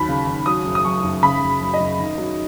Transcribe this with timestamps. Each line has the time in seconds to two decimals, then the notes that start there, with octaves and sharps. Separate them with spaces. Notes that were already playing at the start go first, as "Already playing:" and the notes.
Already playing: D#2 F#3 B5
0.09 C#3
0.27 D#2
0.46 F#3 D#6
0.65 F#1
0.75 D#6
0.85 F#2 C#6
1.04 F#1
1.23 C#3 B5
1.42 F#1
1.61 F#2
1.74 D#5
1.80 F#1
1.99 D#3
2.18 F#3